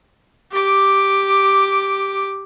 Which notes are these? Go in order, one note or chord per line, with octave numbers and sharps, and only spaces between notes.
G4 D6